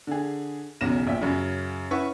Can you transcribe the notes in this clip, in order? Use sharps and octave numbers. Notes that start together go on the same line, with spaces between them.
D3 G#4
B1 E2 C#3 A#6 E7
A#1 E5 G5
F#2 C#3
C#4 E4 B4 E5 F#5 C#6